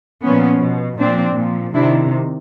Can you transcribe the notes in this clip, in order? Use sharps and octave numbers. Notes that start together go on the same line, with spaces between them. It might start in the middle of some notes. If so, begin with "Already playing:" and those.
A#2 F3 B3 C#4
B2
A#2 F3 C4 D4
A#2 F3
C3 D#3 D4 E4